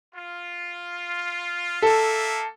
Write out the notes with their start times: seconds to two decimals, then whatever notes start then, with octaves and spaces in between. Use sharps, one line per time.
0.15 F4
1.82 A#3 A4 E5